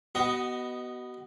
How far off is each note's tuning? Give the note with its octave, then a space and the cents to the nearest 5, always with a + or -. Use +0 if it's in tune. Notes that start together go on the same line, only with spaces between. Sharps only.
B3 +0 F#4 +35 D#5 +0